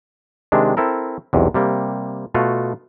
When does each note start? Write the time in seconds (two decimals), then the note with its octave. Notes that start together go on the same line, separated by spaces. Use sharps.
0.52 C3 D#3 G#3 D4
0.77 C4 E4 A4 A#4
1.33 B1 E2 C3
1.54 C3 G3 A#3
2.34 B2 A3 F4 F#4